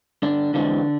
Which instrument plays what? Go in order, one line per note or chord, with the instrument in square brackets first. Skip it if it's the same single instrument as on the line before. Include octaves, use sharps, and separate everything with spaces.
[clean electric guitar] G2 D3 D4
D3 E3 G#3 C4 D4